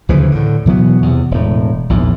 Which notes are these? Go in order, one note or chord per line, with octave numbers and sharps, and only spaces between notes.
D2 C#3 E3 F3
A2 D3
B2 E3 F#3 B3
E2 C3
E1 A2
A#1 E2 G#2